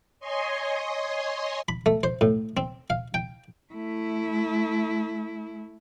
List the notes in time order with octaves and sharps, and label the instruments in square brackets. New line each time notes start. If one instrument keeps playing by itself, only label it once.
[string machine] C#5 D#5 G#5 C6
[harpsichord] B5
A3
C5
A2
C4
F5
G5
[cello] A3 E4